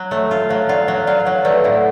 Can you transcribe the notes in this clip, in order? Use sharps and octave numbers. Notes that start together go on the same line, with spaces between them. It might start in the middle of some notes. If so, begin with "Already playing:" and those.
Already playing: F#3
A3 C#5
F4
F#3 C#5 F5
F4 D5 F#5
F#3 C#5 F5
F4 D5 F#5
F#5
F#3 C#5 F5
A3 B4 D5
A2 D5 F#5